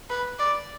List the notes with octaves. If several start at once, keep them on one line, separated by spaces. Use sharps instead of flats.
B4
D5